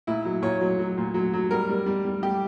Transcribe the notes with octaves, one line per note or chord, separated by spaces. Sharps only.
A#2 E4
F#3
A#2 C#5
F#3
F#3
A#2
F#3
F#3
G3 A#4
G3
G3
G3
G3 G4